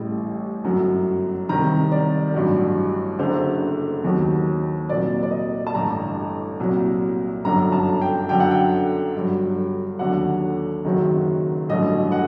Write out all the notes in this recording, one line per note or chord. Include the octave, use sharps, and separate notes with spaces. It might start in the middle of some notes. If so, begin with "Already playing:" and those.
Already playing: A1 A2 G3
G1 F#2 F#3
C2 C3 D#3 G3 A#5
D5
A1 G2 F#3
F#1 F#2 D3 C5
D#2 D#3 F#3
C2 A#2 F#3 D5
D5
D#5
A5
A1 G2 D3 G3 A#5
C2 A#2 F#3
G1 F#2 D3 F#3 A#5
A5
G5
F#2 D3 F#3 G5
F#5
G5
G1 G2 F#3
D#2 D3 F#3 F#5
F#1 F#2 D#3 F#3
A1 G2 D3 F#3 D#5
F#5